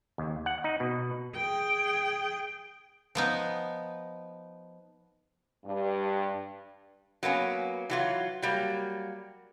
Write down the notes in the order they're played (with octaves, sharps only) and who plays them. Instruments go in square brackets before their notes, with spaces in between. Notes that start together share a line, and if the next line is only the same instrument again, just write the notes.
[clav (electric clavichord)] D#2
F#5
D#4
B2
[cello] G#4 G5
[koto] F3 B3 D#4
[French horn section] G2
[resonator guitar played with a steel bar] F#3 A#3 B3 C#4
E3 F#3 F4
F#3 G3 A#3